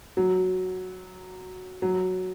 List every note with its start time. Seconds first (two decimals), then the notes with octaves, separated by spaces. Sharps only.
0.17 F#3
1.82 F#3